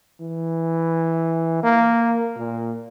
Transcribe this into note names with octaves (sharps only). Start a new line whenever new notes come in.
E3
A#3
A#2